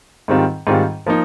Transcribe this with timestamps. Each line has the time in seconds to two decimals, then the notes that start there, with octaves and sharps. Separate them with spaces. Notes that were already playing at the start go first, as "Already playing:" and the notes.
0.28 G#2 D#3 G3 C4 F4
0.67 G#2 D#3 G3 C4 F4
1.06 F3 A#3 D#4